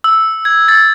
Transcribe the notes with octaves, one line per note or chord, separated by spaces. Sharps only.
E6
G#6
A6